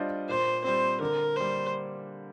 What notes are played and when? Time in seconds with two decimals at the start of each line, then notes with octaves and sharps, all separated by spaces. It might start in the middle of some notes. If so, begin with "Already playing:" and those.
Already playing: G3 D4 F4 C5 D#5
0.29 A#2 C5
0.64 G3 C4 C5
1.01 D3 A#4
1.36 G3 A#3 C5